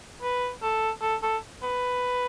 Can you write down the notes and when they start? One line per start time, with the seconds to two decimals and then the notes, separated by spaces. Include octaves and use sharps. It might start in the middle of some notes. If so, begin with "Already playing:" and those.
0.22 B4
0.62 A4
1.02 A4
1.23 A4
1.63 B4